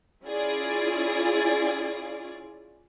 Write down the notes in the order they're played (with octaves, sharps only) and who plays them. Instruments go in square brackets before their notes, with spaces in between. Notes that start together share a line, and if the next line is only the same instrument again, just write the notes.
[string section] C#4 E4 F4 G#4 D5